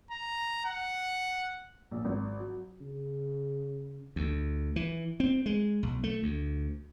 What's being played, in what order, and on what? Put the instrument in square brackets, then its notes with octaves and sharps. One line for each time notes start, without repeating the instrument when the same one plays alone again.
[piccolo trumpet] A#5
F#5
[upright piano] A#1
G#1
F#3
[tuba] C#3
[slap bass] D2
E3
C4
G#3
B1
A3
D2